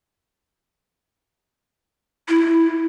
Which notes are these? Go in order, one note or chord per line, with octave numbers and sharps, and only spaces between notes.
E4